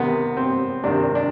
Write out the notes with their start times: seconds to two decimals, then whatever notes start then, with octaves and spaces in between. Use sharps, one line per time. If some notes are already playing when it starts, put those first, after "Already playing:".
Already playing: C3 D#3 B3
0.37 C4
0.84 C3 D#3 D4
1.15 D4